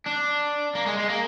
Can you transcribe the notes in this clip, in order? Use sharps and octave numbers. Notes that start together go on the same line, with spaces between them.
D4
A#3
G#3
G#3
A#3